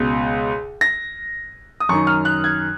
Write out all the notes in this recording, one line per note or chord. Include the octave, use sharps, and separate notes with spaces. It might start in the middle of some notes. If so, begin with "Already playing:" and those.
Already playing: C#2 B2
A#6
D#6
F#2 D#3 C#6
F6
F#6
G#6